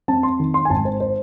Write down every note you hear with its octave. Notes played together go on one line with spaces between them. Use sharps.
C4 A5
C6
D#3
C6
G#5
G#1 A5
C5
C5